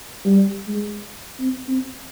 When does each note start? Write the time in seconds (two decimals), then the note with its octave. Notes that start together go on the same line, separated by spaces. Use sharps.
0.25 G3
0.68 G#3
1.40 C4
1.68 C4